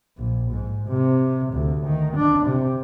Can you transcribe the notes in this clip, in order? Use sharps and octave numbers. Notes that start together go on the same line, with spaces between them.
A#1
G#2
C3
D2
D#3
D4
C3